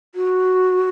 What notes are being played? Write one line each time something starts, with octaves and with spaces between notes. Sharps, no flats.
F#4